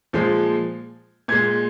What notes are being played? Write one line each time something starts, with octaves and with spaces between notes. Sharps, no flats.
A#2 F3 G#3
A#2 G#3 G#6